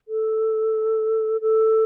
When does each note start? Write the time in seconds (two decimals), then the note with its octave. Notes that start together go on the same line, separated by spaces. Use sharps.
0.08 A4
1.41 A4